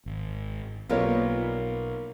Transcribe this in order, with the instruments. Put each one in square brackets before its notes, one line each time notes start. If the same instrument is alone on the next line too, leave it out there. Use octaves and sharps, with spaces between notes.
[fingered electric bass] G#1
[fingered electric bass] B1 [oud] G3 A#3 B3 [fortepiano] F4 A#4 C#5